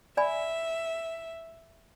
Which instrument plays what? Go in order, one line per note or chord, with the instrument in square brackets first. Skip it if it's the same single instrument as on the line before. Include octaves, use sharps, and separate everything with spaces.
[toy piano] D5 G#5 B5 [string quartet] E5